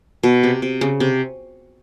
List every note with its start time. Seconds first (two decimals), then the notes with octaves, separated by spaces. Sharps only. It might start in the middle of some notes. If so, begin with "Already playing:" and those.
0.23 B2
0.43 C3
0.62 C3
0.81 C#3
1.00 C3